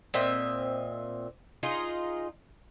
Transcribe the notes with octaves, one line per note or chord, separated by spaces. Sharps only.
A#2 C4 D#5 E5
D#4 F4 G#4 D#5